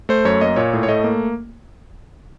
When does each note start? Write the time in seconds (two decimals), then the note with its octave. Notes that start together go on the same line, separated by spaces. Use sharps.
0.09 A3 C5
0.25 F#2 C#5
0.41 A#3 D#5
0.56 A#2 C#5
0.73 A2
0.83 C#5
0.88 A3 D#5
1.04 A#3